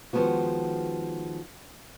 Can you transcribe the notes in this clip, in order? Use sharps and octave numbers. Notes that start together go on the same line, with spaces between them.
D#3 F3 G#3 B3 F#4